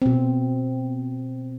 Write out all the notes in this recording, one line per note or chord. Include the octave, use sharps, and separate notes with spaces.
B2 C4